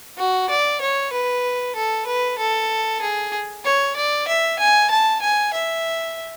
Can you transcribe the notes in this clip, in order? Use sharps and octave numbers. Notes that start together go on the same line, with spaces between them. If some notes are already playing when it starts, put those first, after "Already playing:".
F#4
D5
C#5
B4
A4
B4
A4
G#4
C#5
D5
E5
G#5
A5
G#5
E5